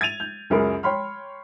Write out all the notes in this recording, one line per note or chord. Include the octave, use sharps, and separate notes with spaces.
G#6 A6 D#7 F7
G6
C#2 F#2 C#4 G#4 A#4 B5
C#5 G5 B5 C6 F6